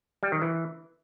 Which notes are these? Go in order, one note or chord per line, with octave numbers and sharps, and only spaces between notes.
G3
D#3
E3